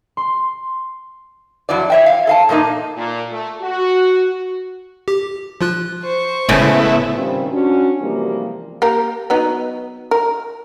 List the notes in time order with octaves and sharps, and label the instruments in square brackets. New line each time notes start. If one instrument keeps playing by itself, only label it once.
[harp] C6
[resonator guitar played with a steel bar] F2 F#3 E4 D5
C#5 E5 G5
F5
A4 F5 A5
A#2 A3 A#3 D#4
[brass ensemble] A#2
A3
F#4
[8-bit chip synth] G4
F3 F4 F#6
[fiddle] C5 C#6
[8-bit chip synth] G1 G#3 G#5 [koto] A2 C#3 [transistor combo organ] A3 B3 E4
[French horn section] D#3 G3 C4 C#4 F4 C5
C#4 D4 F#4
C3 E3 F3 G3 G#3 A#3
[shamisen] A#3 G4 A#4
F#3 B3 D#4
A#4